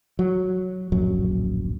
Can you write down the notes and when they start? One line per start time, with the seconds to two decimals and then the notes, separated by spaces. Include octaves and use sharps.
0.19 F#3
0.92 D1 A#1 F#2 F#3